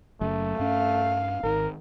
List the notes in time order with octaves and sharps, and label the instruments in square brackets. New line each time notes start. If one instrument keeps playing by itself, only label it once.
[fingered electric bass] F#1 F#2 [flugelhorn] A3
[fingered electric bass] G2 C#4 [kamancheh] F5
[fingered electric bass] G#1 D#3 [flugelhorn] A#4